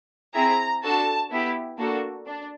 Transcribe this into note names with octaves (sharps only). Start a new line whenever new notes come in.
C4 E4 G#4 A#5
D4 F#4 A4 A5
B3 E4 G4
A#3 D4 F#4 A4
D4